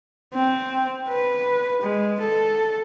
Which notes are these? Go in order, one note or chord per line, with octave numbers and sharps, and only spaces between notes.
C4
B4
G#3
A4